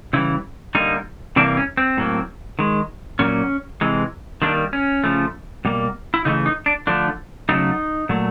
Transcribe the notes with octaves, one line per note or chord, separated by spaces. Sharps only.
C#3 E3 G3 E4
D3 G3 A#3 D#4
C3 E3 G3 A#3 D4
C#4
C4
A2 F#3 A#3
D#3 G#3
A#2 F#3 A#3 C#4
C3 E3 G#3
D#3 G3 A#3 D4
C#4
C#3 F3 A3
B2 G3 A#3
E4
C#3 E3 A3 D#4
D#4
D4
D3 F3 A3 D4
C#3 F#3 A3 D#4
A#2 F#3 A3